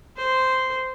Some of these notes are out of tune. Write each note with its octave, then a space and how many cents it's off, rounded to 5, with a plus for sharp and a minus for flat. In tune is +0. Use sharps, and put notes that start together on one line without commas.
C5 -10